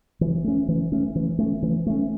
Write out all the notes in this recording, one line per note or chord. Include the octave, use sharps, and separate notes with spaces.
E3
A3 C#4
E3
A3 C#4
E3
A3 C#4
E3
A3 C#4